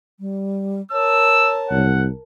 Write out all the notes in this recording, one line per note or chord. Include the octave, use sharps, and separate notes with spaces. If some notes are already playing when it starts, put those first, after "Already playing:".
G3
A#4 C#5 A5 E6
C2 F#5